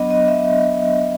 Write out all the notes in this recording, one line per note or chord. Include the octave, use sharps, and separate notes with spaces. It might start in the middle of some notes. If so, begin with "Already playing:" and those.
Already playing: F#3 B3 D4 D#5
D#5
E5